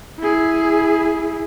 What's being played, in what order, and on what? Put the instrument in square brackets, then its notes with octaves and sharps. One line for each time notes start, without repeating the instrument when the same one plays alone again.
[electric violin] E4 G#4